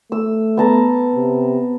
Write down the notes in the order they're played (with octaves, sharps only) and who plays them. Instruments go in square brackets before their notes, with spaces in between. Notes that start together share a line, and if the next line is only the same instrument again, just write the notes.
[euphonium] A3 [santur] E6
[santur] B3 A5 A#5
[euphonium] C3